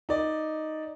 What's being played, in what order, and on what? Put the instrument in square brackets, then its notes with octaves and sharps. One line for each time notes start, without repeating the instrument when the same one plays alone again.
[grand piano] D#4 D5